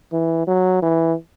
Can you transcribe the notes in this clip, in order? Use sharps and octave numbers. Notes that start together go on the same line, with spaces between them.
E3
F#3
E3